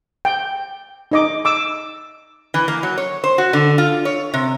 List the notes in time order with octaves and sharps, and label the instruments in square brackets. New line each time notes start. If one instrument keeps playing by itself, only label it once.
[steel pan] G5
D#4 D#5 D6
D6 E6
[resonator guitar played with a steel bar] E3
A#3
F#3
C#5
C5
F#4
D3
F4
C#5
C3